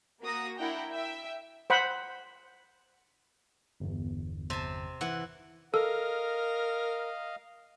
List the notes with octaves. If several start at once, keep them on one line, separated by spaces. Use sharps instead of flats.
A#3 F#4 A#5 D#6 A#6
D4 E4 A#4 F#5 G5 A#5
E5 G5 E6
C5 F#5 B5
G1 E2
C3 A5
E3 F#5
A4 A#4 D#5 F5